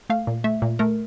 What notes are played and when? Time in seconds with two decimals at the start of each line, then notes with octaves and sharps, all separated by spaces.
0.10 A3 F5
0.27 A#2
0.44 A3 E5
0.62 A#2
0.79 A3 A#4